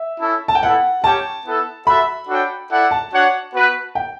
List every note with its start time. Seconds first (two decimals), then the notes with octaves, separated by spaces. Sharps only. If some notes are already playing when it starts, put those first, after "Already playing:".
Already playing: E5
0.20 C#4 E4 A4
0.48 A5
0.55 G5
0.62 B3 E4 A4 F#5
1.04 C#4 G4 C#5 G5 A5
1.46 B3 E4 A4
1.87 F#4 A4 E5 B5
2.29 D4 F#4 A4 C#5 G5
2.71 E4 A4 D5 F#5
2.91 A5
3.12 D4 F#4 C#5 F#5
3.54 B3 F#4 B4
3.95 G5